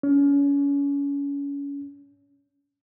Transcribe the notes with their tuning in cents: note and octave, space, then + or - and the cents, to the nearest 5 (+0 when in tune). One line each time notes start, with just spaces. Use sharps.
C#4 +30